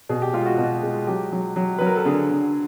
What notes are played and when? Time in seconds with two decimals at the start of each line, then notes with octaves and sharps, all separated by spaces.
0.09 B2 G#4
0.22 G4
0.33 G#3 F4
0.46 F#4
0.58 B2
0.83 G#3
1.07 F#3 G4
1.32 F#3
1.56 F#3
1.78 F#3 B4
1.86 A#4
1.96 A4
2.05 D3 G#4
2.30 D3